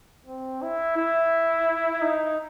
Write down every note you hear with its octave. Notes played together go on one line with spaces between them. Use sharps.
C4
E4
E4
D#4